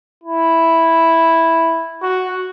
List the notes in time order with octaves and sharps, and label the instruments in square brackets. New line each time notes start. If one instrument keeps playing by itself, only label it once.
[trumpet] E4
F#4